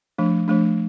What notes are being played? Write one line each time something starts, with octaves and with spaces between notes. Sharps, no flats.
F3 A3 D4
F3 A3 D4